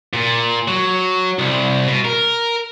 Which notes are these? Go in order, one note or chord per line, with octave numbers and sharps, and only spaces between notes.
A#2
F#3
C2
B2
A#4